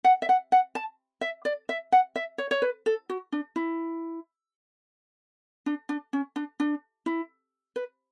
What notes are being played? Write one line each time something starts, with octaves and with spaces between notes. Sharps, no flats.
F#5
E5
F#5
F#5
A5
E5
D5
E5
F#5
E5
C#5
C#5
B4
A4
F#4
D4
E4
D4
D4
C#4
D4
D4
E4
B4